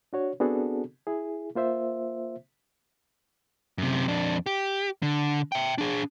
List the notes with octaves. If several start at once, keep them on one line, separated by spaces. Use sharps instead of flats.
D4 F#4 C#5
B3 C4 D4 F#4 G#4 A4
E4 G#4
A#3 F4 C5 E5
F#2 C3
F2 D4
G4
D3
E5 G5
D4 G#4